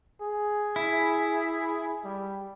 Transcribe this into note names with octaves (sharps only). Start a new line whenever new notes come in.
G#4
E4
G3